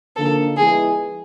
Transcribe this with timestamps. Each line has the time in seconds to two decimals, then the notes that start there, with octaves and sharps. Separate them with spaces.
0.16 D3 F3 A#3 D#4 A4
0.57 F3 G#3 B3 E4 G#4